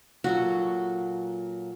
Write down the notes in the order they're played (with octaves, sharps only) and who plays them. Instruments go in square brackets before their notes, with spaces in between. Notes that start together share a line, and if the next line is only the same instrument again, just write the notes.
[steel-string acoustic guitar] A#2 F#3 A4 [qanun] F#4